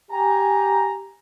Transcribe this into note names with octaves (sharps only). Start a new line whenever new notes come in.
G4 G#5 A#5